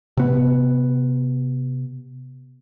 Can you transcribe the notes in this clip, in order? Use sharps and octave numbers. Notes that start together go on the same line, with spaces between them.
C3 B3